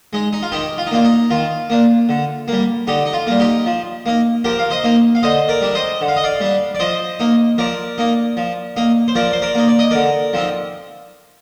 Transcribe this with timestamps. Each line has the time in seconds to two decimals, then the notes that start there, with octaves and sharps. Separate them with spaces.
0.13 G#3 D#4
0.33 D#4
0.42 F4
0.52 D#3 D#4 G4
0.78 F4
0.87 D#4
0.91 A#3 D4 F4
1.04 D#4
1.30 D#3 F4
1.70 A#3 D4
2.09 D3
2.48 G3 A#3
2.87 D3 D#4 G4
3.06 D#4
3.13 F4
3.27 G3 A#3
3.40 D#4 G4
3.66 F3
4.06 A#3 D#4
4.44 F3 G4 A#4
4.59 F5
4.71 C5 D#5
4.84 A#3 D#4
5.15 F5
5.23 D3 C5 D#5
5.49 A#4 D5
5.62 G3 D4
5.75 C5 D#5
6.01 D3
6.08 F5
6.16 D#5
6.24 D5 F5
6.40 G3 D4
6.75 D5
6.80 F3 C5 D#5
7.19 A#3 D#4
7.58 F3 A#4 D5
7.98 A#3 D#4
8.37 F3
8.77 A#3 D#4
9.08 C5
9.15 F3 A#4 D5
9.33 C5
9.42 A#4 D5
9.55 A#3 D#4
9.68 D5
9.79 D#5
9.91 D3 A#4 D5
10.33 F3 C4 D#4